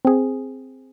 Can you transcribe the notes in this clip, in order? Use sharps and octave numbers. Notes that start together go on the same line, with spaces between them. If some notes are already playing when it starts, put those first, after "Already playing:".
C4 G#4